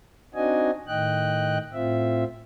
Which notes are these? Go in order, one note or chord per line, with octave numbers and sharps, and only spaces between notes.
C4 D4 D#4 F#4 D#5 G#5
A2 D#3 D#5 G5 F#6
A2 C4 F4 E5